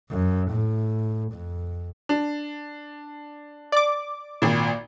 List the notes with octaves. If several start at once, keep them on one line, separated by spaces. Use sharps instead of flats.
F#2
A2
F2
D4
D5 D6
G#1 A#2